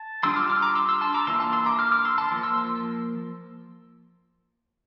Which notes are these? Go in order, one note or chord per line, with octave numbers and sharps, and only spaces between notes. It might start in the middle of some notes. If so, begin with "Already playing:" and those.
Already playing: A5
G3 D4 F4 C6 E6
D6 F6
D6 F6
A#5 D6
C6 E6
C6 E6
A5 C6
A#5 D6
E3 A#3 D4 F4 C6 E6
A5 C6
C6 E6
A#5 D6
D6 F6
D6 F6
C6 E6
A5 C6
F3 A#3
C6 E6